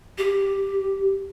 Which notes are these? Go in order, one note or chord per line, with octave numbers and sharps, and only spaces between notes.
G4